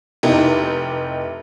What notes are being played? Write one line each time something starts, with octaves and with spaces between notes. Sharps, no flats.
F1 D#4 E4 G4